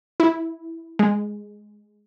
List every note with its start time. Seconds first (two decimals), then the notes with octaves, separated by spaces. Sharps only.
0.20 E4
0.99 G#3